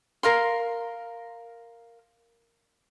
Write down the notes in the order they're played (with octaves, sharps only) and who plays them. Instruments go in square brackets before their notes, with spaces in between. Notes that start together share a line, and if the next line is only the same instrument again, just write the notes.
[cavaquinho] A#4 F5 C6